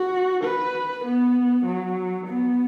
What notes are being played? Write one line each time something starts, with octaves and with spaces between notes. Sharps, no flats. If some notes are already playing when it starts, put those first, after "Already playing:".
Already playing: F#4
B4
B3
F#3
B3